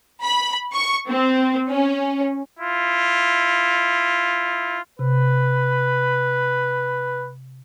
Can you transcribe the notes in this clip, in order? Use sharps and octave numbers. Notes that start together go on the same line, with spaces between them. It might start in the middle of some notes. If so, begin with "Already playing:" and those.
B5
C#6
C4
C#4
E4 F4
C3 B4